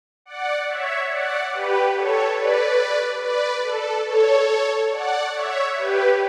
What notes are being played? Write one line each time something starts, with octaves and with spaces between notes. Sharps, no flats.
D5 F#5
C#5 E5
D5 F#5
G4 B4
A4 C#5
B4 D5
B4 D5
A4
A4 C#5
D5 F#5
C#5 E5
G4 B4